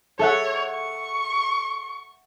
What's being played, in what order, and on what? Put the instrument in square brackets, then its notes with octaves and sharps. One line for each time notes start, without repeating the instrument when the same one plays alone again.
[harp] A4 E5 F#5 [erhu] C#5
[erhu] C#6